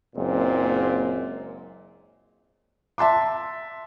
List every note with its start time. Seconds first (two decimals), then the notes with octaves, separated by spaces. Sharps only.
0.15 F#1 A#2 G#3 C4
2.98 E5 A5 C6 D6